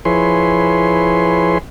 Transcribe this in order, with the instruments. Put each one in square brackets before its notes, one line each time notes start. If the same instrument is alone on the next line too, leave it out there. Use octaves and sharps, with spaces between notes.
[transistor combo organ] F3 E4 G#4 B4 C#5 C6